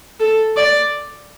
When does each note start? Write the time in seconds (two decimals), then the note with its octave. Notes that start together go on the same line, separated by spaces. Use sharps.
0.20 A4
0.57 D5